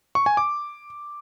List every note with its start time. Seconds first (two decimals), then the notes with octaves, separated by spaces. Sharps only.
0.15 C#6
0.26 G#5
0.37 D6